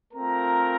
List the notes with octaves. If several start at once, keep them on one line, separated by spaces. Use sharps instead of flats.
A3 C4 F4 A#4 A#5